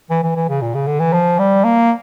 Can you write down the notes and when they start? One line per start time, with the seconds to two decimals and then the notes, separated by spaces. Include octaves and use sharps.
0.10 E3
0.23 E3
0.36 E3
0.49 C#3
0.61 A#2
0.75 C#3
0.87 D3
1.00 E3
1.13 F3
1.39 G3
1.64 A#3